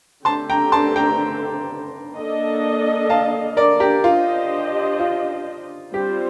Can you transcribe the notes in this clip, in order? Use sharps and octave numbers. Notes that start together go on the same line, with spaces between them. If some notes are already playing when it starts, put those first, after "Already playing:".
D3 A3 C4 G4 A5 C6
G5 A#5
A5 C6
G5 A#5
A#3 D4 A4 D#5
F5 A5
A#4 D5
G4 A#4
D4 F4 G4 C5 D#5
F4
G3 C4 F4 G4 C5